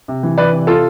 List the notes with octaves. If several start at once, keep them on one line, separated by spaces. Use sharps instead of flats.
C3
E3
E3 B4 D5
C3
F4 A4